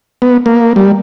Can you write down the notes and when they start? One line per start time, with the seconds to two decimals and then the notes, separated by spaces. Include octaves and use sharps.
0.22 B3
0.46 A#3
0.76 G3